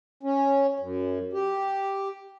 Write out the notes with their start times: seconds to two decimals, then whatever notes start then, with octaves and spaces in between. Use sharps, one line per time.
0.23 C#4
0.80 F#2
1.33 G4